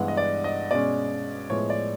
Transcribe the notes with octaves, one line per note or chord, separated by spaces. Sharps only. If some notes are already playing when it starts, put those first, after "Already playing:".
Already playing: G2 E3 G#3 B3 F#5
D#5
D5
D#5
B2 G#3 C#4 D5
A2 F3 G#3 B3 C#5
D5